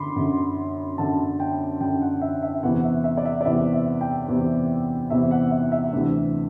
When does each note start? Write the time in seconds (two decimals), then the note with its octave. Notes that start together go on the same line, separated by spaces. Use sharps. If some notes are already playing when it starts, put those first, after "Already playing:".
Already playing: F#2 D3 B5 C6 D6
0.16 F#2 D3
0.98 F#2 D3 A5
1.40 G5
1.81 F#2 D3 G5
2.01 F#5
2.22 E5
2.43 E5
2.63 E2 C3 E3 F#5
2.84 E5
3.04 E5
3.17 D5
3.25 E5
3.41 D5
3.45 E2 C3 E3 E5
3.73 E5
4.01 G5
4.28 E2 C3 E3
5.10 E2 C3 E3 E5
5.31 F#5
5.51 E5
5.72 E5
5.93 D2 C3 E3